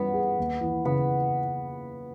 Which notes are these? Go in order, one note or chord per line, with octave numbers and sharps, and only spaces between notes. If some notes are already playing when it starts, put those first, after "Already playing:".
Already playing: E3 G3 B3 C#4
G#4
D#2
E3
C#3 B3